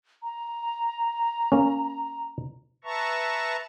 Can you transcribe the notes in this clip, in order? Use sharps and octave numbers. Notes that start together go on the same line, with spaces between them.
A#5
A#3 C#4
B4 E5 A5 A#5 C#6